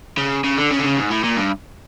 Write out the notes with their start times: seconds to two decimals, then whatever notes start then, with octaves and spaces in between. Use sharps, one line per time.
0.18 C#3
0.44 C#3
0.58 D3
0.71 C#3
0.79 D3
0.84 C#3
0.97 G#2
1.11 A2
1.24 A#2
1.37 G2